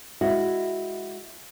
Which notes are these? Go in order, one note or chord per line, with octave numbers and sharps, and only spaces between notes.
G#3 E4 F#4